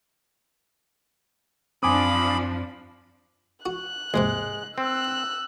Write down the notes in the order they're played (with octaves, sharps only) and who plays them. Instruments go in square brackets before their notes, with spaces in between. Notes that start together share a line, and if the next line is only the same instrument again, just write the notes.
[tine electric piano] F#2 C4 [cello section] F3 D4 [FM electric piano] G#5 D6 D#6 [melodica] B5
[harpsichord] F#4 [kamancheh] F#6
[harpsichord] D#2 G#2 C3 [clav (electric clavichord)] G#3
[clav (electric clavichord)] C4 [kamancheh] E6 F#6